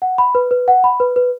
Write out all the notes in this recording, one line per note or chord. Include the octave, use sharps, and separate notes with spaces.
F#5
B5
B4
B4
F#5
B5
B4
B4